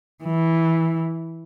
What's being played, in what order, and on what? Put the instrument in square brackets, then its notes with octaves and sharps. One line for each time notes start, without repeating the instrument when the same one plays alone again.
[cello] E3